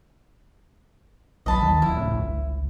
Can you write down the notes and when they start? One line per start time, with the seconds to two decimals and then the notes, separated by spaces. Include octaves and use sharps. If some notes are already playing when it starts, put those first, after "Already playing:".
1.46 A#1 F#3 D#5 A5 B5
1.62 D#2 D#3 F#3
1.82 D1 F3 E4
1.96 A2 C#3
2.11 G1 C#2